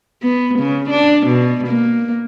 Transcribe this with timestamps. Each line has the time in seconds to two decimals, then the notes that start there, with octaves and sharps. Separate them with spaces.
0.22 B3
0.59 C#3
0.90 D4
1.27 B2
1.67 A#3